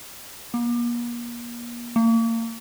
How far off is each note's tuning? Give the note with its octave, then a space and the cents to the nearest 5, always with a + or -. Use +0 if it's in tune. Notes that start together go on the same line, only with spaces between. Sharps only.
A#3 +40
A#3 -35